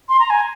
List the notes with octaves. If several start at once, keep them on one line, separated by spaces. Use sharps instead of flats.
C6
A#5
G#5